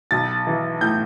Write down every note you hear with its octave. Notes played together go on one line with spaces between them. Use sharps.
B1 A6
E3
A2 G6